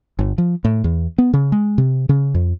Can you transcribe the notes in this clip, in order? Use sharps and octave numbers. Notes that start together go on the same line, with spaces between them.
G1
F3
A2
E2
B3
C#3
G#3
C3
C#3
F2